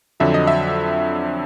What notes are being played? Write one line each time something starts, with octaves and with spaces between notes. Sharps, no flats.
F2 D3 F#3 E5
D#5
E5